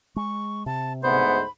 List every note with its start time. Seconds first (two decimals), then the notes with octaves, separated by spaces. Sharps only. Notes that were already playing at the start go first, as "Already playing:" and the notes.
0.16 G#3 C#6
0.66 C3 A5
1.03 D2 G#2 B3 C5 B5